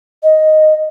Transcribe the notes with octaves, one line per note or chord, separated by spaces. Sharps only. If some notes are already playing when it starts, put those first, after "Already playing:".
D#5